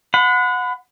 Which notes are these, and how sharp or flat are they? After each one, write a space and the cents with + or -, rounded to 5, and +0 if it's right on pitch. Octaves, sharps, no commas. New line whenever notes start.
F#5 -25 B5 +35